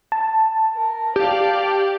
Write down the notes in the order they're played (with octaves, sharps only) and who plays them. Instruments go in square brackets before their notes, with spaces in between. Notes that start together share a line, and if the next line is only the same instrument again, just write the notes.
[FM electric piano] A5
[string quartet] A#4
[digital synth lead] G4 [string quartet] D5 F5